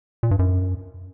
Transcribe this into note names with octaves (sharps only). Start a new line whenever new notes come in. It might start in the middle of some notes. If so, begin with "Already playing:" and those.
A#2
G2
F#2